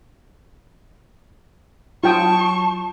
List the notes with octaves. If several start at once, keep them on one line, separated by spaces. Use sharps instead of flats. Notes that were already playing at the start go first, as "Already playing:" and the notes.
F#3 F4 G5 A5 C#6 D#6